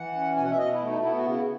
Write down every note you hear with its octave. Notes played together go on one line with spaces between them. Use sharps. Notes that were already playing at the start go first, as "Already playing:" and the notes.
Already playing: E3 F#5
C#4
B2 G#5
F#5
E5
B2 D#5
E4
A3
D#4
B3 E4
F#4
C#3
E4